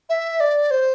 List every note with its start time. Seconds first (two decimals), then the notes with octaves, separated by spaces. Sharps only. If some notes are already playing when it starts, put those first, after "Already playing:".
0.09 E5
0.40 D5
0.71 C5